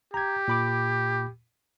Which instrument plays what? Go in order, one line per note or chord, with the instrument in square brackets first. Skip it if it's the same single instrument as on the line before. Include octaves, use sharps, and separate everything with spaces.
[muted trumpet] G4 [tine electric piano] A#5 G#6
[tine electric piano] A#2 B5 D6